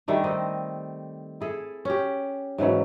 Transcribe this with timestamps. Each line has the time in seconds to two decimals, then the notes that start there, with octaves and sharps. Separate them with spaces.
0.08 D#3 G3 A3 D4
0.24 C4 D#4 D#5
1.41 E4 G#4 A4
1.85 C#4 G4
2.58 G#2 C#3 E3 F#3